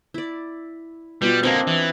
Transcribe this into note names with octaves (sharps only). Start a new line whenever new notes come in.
E4 D5
B2 G3 F4
D3 A#3 C4 D4 D#5
E3